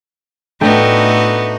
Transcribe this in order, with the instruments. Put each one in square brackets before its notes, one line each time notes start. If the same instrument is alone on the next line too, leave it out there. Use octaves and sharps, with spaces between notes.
[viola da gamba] A2 D#4 F#4 [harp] A3 D4 G5 [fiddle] B3